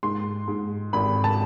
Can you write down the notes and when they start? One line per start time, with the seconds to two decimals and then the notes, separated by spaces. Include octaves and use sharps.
0.03 G#2 C6
0.48 G#2
0.93 G#1 B5
1.24 A5